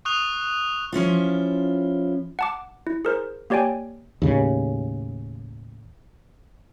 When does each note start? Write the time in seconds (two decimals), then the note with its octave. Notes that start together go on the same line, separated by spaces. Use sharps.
0.05 C#6 D#6 F#6 F7
0.92 F3 C#4 E4 F4
2.39 F#5 A5 D6
2.87 E4
3.05 G#4 A#4 C5
3.50 A#3 G4 C#5 D5 G5 G#5
4.22 D#2 A2 C#3